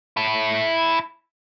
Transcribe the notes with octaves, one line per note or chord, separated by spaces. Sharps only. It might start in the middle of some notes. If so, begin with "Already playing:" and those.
E4 A5